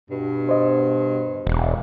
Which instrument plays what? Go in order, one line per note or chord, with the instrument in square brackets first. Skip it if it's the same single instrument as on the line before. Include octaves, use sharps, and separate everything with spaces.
[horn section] G2 B2
[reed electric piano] C5 D#5
[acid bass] E1